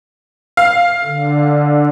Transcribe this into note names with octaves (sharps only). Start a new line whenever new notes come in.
F5
D3